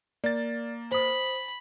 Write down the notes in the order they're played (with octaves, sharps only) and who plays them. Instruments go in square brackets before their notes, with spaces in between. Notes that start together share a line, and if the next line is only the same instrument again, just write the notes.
[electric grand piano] A#3 A6 [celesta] D5
[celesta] C5 D#6 [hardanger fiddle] B5